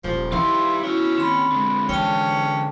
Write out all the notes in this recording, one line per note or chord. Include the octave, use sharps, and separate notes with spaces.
D#1 F3
D#3 G3 D#4 E4 F5 C6
B3 C#4 E4 F#4
D#2 C4 B5
D3 G#3
E3 C#4 G5 A5